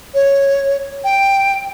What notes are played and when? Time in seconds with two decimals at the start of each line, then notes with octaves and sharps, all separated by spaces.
0.14 C#5
1.04 G5